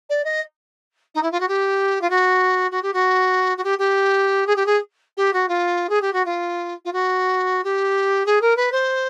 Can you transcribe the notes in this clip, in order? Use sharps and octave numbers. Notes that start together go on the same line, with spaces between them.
D5
D#5
D#4
E4
F4
F#4
G4
F4
F#4
F#4
G4
F#4
F#4
G4
G4
G#4
G4
G#4
G4
F#4
F4
G#4
G4
F#4
F4
F4
F#4
G4
G#4
A#4
B4
C5